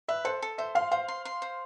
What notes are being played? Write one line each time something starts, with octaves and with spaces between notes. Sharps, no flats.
B4 E5
A4 C5
A4
C5 E5
F5 C6
C5 F5
C6
C6
C5